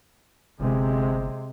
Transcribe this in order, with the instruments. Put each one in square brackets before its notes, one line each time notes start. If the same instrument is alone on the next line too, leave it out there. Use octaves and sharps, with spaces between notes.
[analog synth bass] G1 [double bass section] C3 G#3